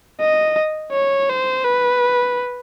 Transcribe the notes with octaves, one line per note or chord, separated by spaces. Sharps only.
D#5
C#5
C5
B4